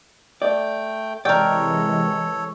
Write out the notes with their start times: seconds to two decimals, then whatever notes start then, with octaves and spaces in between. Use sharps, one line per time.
0.42 A3 D5 G5
1.25 C3 E3 G#3 A4 A#4 C#5 D5 G5